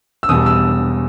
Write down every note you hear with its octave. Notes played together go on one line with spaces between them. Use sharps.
E6
E1 E2 B2 G3 D#6
E6